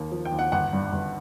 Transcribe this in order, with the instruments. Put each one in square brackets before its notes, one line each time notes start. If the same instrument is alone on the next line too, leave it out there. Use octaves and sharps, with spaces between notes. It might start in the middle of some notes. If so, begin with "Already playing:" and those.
Already playing: [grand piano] D#2 A#3
F3
G5
D#2
F#5
G1 F#5
G2
G1